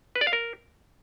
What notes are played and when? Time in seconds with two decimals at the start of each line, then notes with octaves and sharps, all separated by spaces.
0.16 B4
0.21 D5
0.27 F5
0.33 A#4